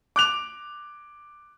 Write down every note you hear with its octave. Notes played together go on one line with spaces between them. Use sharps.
D6 F#6 F7